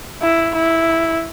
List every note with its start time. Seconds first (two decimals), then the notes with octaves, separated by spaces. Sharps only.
0.22 E4
0.55 E4